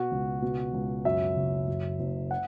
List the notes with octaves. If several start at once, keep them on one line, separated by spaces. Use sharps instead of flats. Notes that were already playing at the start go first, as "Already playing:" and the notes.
Already playing: B2 F#4
C#2
B2
C#2
F#2 E5
F#1
F#2
F#1
F#5